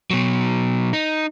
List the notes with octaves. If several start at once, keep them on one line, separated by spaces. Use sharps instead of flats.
B2 F#3
D#4